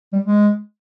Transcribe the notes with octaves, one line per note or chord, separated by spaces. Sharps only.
G3
G#3